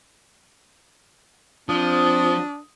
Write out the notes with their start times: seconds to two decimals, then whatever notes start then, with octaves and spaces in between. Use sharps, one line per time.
1.69 F3 C4 D4 D#6